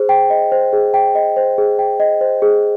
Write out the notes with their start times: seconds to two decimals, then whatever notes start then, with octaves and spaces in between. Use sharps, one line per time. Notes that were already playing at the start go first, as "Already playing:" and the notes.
Already playing: G#4 C5
0.09 G5
0.30 D#5
0.52 C5
0.73 G#4
0.94 G5
1.15 D#5
1.36 C5
1.58 G#4
1.79 G5
2.00 D#5
2.21 C5
2.42 G#4